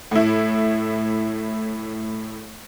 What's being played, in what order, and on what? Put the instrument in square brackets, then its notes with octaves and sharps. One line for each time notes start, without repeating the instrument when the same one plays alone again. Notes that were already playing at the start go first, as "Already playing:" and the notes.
[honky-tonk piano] A2 E4